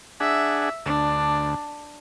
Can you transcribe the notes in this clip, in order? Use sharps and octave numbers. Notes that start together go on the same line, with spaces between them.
D4 G#4 E5 F#5
D2 D4